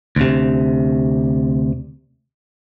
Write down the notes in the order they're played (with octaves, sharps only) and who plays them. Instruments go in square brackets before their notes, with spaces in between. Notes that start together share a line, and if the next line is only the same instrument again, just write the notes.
[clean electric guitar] D2 C3